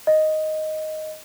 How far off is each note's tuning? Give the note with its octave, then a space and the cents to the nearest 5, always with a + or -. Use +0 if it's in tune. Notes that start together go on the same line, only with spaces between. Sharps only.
D#5 +0